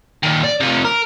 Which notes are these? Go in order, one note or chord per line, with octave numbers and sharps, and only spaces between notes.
A#2 D#3
D5
C3 F3
A#4